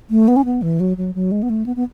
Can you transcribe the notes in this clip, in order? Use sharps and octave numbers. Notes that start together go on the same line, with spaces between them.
A3
B3
C#4
B3
E3
F#3
F#3
F#3
G#3
B3
A3
B3
B3